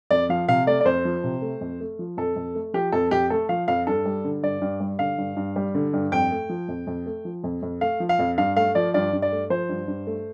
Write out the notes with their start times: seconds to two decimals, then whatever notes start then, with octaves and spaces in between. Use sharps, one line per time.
0.11 F2 D5
0.29 F3 F5
0.48 C3 F5
0.67 A3 D5
0.80 D5
0.85 F2 C5
1.05 F3
1.24 C3
1.42 A3
1.61 F2
1.80 A3
1.99 F3
2.17 F2 A4
2.36 F2
2.55 A3
2.74 F3 G4
2.92 F2 A4
3.11 F2 G4
3.30 A3 A4
3.49 F3 F5
3.68 F2 F5
3.87 G2 A4
4.05 G3
4.25 D3
4.43 G2 D5
4.61 G2
4.80 G3
4.99 D3 F5
5.18 G2
5.37 G2
5.56 G3
5.75 D3
5.93 G2
6.12 F2 G5
6.31 A3
6.49 F3
6.68 F2
6.87 F2
7.06 A3
7.25 F3
7.44 F2
7.62 F2
7.81 A3 F5
8.00 F3
8.09 F5
8.19 F2
8.38 G2 F5
8.56 A3 F5
8.75 F3 D5
8.94 G2 D5
9.13 G2
9.22 D5
9.32 A3
9.50 F3 C5
9.69 G2
9.88 G2
10.07 A3